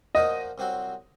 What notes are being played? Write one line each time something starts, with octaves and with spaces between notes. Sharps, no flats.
A#2 F3 A#3 D#4 F#4 D#5
C2 C3 F#3 C4 F#4